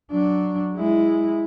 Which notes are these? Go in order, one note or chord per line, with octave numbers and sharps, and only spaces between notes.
F#3 D4
G#3 E4